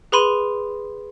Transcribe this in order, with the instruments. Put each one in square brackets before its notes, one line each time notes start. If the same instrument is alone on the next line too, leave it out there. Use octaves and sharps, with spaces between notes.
[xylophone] G#4 B4 B5 C6 D#7